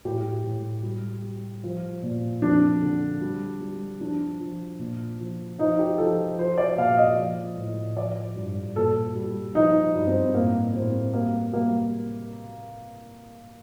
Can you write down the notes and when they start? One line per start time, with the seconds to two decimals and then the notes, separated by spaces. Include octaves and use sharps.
0.05 A2 G4
0.44 A2
0.83 G3
1.23 G3
1.64 F3
2.03 A#2
2.42 F2 D4
2.82 D3
3.21 G3
3.61 G3
4.00 F3 D4
4.40 F3
4.79 A#2
5.20 F3
5.58 F3 D#4
5.79 G4
5.98 F3 A4
6.38 F3 C5
6.58 D5
6.78 A#2 F5
6.97 D#5
7.17 F3
7.57 A2
7.96 F3 D5
8.36 G2
8.76 A#2 A4
9.15 G3
9.54 F3 D#4
9.94 G2
10.07 C4
10.34 A2 A#3
10.73 A2 C4
11.13 G3 A#3
11.53 G3 A#3